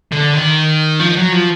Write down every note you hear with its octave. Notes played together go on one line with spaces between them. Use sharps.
D3
D#3
F3
F#3
F3